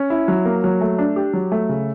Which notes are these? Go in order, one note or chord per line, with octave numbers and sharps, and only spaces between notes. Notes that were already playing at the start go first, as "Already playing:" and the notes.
Already playing: C#4
E4
F#3
A#3
F#3
A3
D4
G4
F#3
A3
C#3